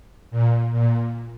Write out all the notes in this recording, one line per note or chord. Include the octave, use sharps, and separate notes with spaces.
A#2
A#2